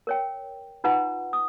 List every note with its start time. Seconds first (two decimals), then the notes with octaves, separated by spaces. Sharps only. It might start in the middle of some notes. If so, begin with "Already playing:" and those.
0.07 A#4 C#5 G5
0.84 D#4 F4 B4 F#5 A#5
1.33 D#6